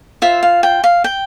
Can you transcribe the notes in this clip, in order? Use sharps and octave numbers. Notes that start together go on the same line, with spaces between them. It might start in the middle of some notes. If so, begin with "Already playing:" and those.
F4 C5 E5
F5
G5
F5
G5